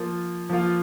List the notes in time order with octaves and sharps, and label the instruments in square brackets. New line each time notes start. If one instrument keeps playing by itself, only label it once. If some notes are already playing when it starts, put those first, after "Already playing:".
Already playing: [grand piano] F3 A#3 F4
F3 A#3 F4